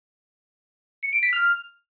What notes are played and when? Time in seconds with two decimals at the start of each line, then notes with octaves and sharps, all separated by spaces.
1.03 C#7
1.13 D7
1.23 B6
1.33 F6